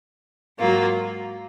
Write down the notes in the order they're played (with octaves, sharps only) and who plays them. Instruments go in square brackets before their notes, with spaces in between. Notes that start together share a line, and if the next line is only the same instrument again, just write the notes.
[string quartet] G#2 F#3 A#3 F4